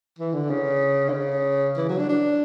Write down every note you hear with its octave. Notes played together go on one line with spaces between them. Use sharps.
E3
D3
C#3
D3
C#3
E3
F#3
D4
D4